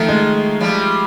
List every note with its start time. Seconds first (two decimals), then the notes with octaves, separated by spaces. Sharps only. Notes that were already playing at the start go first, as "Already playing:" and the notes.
Already playing: D#3 F3 A3
0.09 G#3
0.60 F3 G3